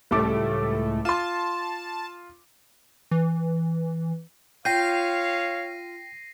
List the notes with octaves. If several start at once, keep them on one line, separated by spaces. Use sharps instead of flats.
C#2 A2 G3 A3 A4 D6
F4 A5 C6
E3
F4 C#5 F5 G5 G6 A#6 C7 D#7